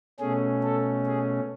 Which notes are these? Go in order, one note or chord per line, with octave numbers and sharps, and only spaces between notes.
B2 A3 C#4 G#4
A4
G#4